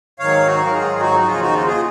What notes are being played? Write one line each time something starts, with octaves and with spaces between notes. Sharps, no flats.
G#2 D#3 F#3 C#5 F5
D#4 F#4
A#4
G#2 D#3 F#3 F4 G#4
D#4 F#4
F#4
D#2 C#3 F3 F4 G#4
D#4 F#4
F4
F4 G#4